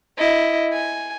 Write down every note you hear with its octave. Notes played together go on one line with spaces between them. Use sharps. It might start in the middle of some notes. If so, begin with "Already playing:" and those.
E4 D#5
G#5